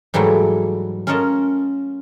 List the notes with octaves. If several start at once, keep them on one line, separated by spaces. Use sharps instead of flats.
G#2 E3 F#3 G3 A3
C#4 F4 A#4 C#5 D#5 A5